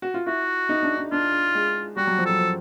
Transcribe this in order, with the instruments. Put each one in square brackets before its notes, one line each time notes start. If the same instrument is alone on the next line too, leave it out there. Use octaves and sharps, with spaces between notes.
[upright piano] F#4
F4
[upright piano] E4 [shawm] F#4
[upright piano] D#4
D4
D#4
[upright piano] D4 [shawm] F4
[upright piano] G#3
[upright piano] G3 [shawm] F#4
[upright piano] F#3
F3
[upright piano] F#3 [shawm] A4
[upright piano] F3